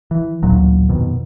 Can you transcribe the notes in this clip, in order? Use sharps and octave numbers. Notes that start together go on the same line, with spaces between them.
E3
A1 D2 A#2 F#3
F2 B2 D#3